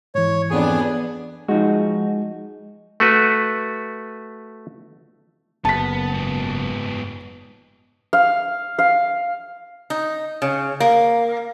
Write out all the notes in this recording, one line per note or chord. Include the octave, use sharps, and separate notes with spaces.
G#2 E3 C#5
F2 B3 D4 G#4 G#5
F3 G#3 D#4 F#4
A3 F#4 B4
F#1 B3 A5 B6
G#2 B3
F5
F5
D#4
C#3
A#3